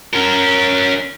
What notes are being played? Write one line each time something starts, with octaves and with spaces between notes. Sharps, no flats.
C#4 A#4